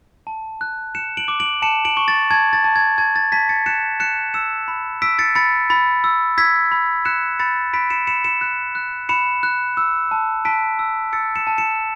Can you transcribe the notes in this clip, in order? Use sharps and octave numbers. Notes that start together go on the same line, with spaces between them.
A5
F#6
F#6 C#7 E7
D7 F#7
D6
D7 F#7
A5 C#7 E7
D7 F#7
C#6
A6
A5 G#6
A6
A5
G#6
A5 G#6
A6
A5 G#6 B6
A6 C#7
F#6 C#7 E7
F#6 C#7 E7
E6 C#7 E7
B5
E6 B6 D7
A6 C#7
B5 A6 C#7
B5 A6
E6
E6 G#6 B6
B5
F#6 C#7 E7
B5 A6 C#7
B5 B6 D7
C#7 E7
B5 C#7 E7
C#7 E7
F#6
F#6
B5 C#7 E7
F#6
E6
A5
A5 B6 D7
E6
E6 A6 C#7
C#7 E7
A5
C#7 E7